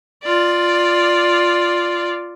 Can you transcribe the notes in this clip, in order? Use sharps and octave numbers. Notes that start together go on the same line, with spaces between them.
F4 D5